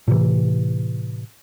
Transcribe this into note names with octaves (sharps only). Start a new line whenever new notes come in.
A2 C3 E3